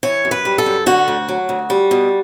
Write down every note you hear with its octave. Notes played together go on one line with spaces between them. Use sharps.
E3 C#5
F#2
B4
G3
A4
F#2
D3 F#4
D2
F#3
D2
G3
B2